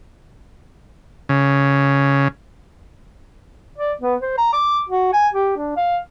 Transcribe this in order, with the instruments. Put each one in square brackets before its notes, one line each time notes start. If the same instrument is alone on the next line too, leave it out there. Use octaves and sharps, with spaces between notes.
[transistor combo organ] C#3
[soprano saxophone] D5
B3
C5
A#5
D6
F#4
G#5
G4
D4
F5